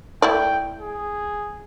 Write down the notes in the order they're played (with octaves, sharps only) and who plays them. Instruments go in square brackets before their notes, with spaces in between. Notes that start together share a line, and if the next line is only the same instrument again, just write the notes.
[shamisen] A3 E4 D5 [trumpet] G5
[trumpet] G#4